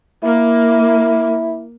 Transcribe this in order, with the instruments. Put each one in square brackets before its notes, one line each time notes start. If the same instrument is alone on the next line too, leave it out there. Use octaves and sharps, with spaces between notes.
[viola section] A#3 [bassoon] E4